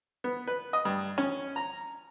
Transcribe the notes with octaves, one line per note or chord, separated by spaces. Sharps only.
B3
B4
D#5
G2
C#4
A#5